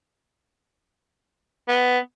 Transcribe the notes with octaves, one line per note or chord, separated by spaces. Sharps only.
B3